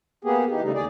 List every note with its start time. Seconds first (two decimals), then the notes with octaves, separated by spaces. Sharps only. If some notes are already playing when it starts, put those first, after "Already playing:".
0.25 A#3 B3 G4 G#4
0.51 E3 D#4 G4
0.63 C#3 G3 A3 D#4
0.74 D#2 G#4 D5